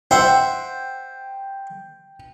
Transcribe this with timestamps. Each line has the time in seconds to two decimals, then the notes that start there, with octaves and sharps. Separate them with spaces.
0.11 C5 E5 F#5 G5